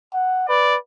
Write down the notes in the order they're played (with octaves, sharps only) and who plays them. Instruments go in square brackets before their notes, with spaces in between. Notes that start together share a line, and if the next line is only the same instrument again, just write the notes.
[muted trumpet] F#5
[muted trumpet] B4 [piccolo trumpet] D5